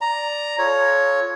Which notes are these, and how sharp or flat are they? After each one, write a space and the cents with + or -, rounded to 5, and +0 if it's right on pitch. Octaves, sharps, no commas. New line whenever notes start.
D5 +0 A#5 +5
F4 +0 A4 -30 C#5 +0